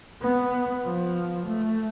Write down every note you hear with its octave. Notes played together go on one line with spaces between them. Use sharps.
B3
F3
A3